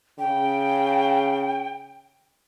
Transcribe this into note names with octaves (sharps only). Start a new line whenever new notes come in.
C#3 G5